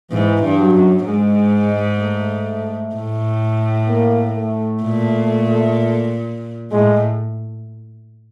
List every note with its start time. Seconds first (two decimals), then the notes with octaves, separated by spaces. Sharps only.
0.11 G#2 E3
0.42 G2
0.58 F#3
0.74 F#2
1.05 G#2 G#3
2.00 A3
2.95 A2
3.88 A#3
4.36 A3
4.83 A#2
6.71 A2 G#3